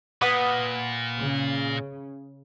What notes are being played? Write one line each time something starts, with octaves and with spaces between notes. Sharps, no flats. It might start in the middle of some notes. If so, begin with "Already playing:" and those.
A#2 B4 F#5 D#6
C#3